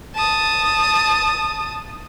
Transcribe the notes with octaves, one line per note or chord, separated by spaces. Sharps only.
A5 D#6